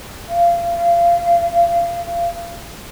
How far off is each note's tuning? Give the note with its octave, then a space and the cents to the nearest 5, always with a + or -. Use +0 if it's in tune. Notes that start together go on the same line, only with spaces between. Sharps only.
F5 -30